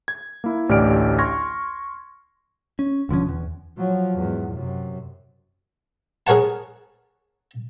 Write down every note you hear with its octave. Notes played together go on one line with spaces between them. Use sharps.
G#6
A#3 E4
A1 D2 G4 D5 F6 D7
C6 C#6 F6 G#6 A#6
C#4
E1 D3 F3 C#4
E2
F3 F#3
E2 G#2
F#2 C3
G#4 A#4 C#5 F#5 A5